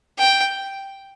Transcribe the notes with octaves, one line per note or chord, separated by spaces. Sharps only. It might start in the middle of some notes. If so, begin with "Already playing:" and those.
G5